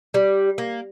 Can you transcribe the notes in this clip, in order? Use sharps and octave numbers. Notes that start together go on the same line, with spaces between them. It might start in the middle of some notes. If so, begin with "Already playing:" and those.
G3
A#3